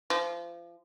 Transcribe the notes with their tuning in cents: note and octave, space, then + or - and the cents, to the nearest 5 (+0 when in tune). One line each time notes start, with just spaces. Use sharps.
F3 -30